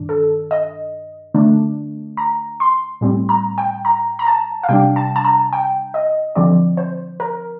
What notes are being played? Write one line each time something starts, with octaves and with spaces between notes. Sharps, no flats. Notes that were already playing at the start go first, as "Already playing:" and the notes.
Already playing: G2 D#3 D4
A4
D#5
D3 A3 D4
A#5
C6
A2 G3 C4
A#5
G5
A#5
A#5
A5
F5
C3 G3 D4 G5
A5
A5
A#5
G5
D#5
D3 F3 C4 D5
C5
A#4